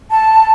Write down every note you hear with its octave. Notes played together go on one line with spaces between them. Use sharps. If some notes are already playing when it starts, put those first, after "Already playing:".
A5